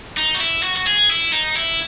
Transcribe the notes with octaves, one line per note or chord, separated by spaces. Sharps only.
D#4
F#4
E4
F#4
F#4
G#4
E4
D#4
E4